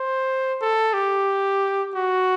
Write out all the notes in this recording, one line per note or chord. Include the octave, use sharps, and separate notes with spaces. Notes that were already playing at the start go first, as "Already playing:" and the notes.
Already playing: C5
A4
G4
F#4